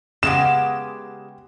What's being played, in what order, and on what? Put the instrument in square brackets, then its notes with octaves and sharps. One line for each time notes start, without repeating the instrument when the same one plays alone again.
[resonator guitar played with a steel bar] C#3 G#3 G4 [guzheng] B3 [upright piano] E7